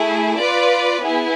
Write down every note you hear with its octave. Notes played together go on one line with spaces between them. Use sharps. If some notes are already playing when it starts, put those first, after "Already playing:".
Already playing: A3 E4 G#4
F4 B4 D5
B3 E4 G#4